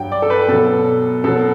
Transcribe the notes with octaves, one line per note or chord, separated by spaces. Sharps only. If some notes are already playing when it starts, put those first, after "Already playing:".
Already playing: G2 F#3 G5
D5
A4
B4
B2 F#3 A4
B2 F#3 A4